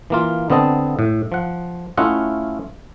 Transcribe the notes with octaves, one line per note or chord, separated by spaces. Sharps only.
E3 A#3 F4
D3 B3 C4 D#5 A5
A2
F3 F#5
A3 C#4 E4 F4 D#5 F#5